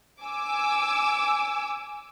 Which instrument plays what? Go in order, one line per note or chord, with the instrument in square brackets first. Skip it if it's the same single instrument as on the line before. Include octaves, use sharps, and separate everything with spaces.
[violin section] G#5 D6 E6